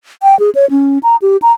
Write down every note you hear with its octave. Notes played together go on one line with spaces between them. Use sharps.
G5
G#4
C#5
C#4
A#5
G4
A#5